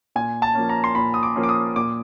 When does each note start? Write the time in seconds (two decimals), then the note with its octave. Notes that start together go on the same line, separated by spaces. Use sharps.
0.16 A#2 G#5
0.42 A5
0.55 F3 A#3 C#4
0.69 A#5
0.84 C6
0.95 A#2 B5
1.14 D#6
1.23 D6
1.36 F3 A#3 C#4
1.43 D6
1.49 D#6
1.76 A#2 D6